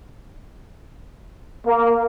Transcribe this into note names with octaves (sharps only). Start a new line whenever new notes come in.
A#3